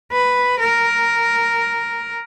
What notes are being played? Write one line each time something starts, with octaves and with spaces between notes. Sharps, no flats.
B4
A#4